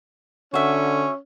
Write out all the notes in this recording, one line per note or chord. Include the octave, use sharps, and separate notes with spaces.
D3 C#4 F#4 E5